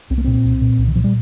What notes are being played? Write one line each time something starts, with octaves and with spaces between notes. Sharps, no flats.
C2 C4
A#3
A#2 C4
C2
A#2
C2
D#3
A#2 F3
G3